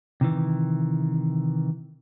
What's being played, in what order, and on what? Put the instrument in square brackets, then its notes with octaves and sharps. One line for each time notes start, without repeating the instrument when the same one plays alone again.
[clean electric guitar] C3 D#3 E3